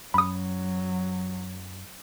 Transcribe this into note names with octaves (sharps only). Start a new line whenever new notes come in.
F#2 F#3 B5 D#6